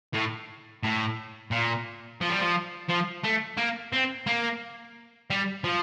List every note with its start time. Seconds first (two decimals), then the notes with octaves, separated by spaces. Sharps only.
0.14 A2
0.83 A2
1.51 A#2
2.21 F3
2.30 G3
2.40 F3
2.89 F3
3.24 A3
3.57 A#3
3.93 C4
4.27 A#3
5.30 G3
5.64 F3